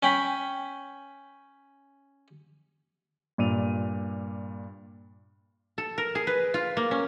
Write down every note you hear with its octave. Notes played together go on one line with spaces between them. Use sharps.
C#4 G5 B5
G2 A#2 D5 D#7 F7
A4
A#4
G#4
B4
F4
A#3
C#4